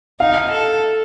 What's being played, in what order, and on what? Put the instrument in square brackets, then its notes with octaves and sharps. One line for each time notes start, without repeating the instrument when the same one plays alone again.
[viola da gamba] D#4 [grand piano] F5
[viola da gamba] A4